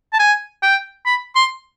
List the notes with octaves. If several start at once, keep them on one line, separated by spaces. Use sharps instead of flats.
A5
G#5
G5
B5
C6